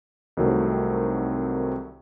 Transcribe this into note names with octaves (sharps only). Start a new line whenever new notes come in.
C2 D#3 F#3 A3 C4